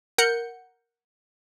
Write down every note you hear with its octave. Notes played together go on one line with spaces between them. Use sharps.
A#4 F#5 G6 C#7